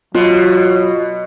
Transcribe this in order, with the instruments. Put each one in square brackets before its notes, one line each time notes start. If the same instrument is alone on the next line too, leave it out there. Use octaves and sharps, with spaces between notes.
[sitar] B2 [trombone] F#3 [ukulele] F4